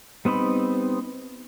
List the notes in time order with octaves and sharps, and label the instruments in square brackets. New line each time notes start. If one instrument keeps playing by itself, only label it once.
[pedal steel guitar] G3 B3 C4 D#4 B5